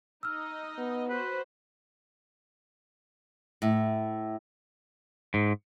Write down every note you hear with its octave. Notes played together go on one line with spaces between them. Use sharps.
D#4 D#5 E6 F6
B3
F#4 B4 C5
A2
G#2